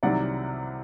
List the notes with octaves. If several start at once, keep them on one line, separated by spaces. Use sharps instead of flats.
C2 C3 D#3 F#3 D5 F#5